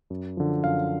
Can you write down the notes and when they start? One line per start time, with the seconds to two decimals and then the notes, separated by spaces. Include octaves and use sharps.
0.10 F#2
0.37 D3 F3
0.64 F#2 F5